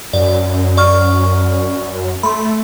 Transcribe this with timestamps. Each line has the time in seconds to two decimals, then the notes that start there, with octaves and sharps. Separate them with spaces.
0.13 F#2 D5
0.77 D5 C#6 F6
2.23 A3 B5 C6